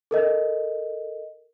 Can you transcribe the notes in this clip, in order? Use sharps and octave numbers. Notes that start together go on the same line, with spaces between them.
A4 A#4 D#5